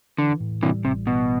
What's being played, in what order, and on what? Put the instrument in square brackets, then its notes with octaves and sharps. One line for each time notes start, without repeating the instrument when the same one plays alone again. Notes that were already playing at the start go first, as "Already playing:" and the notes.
[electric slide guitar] D3 [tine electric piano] E3
[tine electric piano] A2
[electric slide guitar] C3 E3 [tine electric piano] G3
[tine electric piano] A1 [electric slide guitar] C3
[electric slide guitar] B2 [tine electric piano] E3